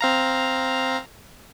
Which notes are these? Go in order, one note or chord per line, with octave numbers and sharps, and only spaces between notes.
C4 F5 A#5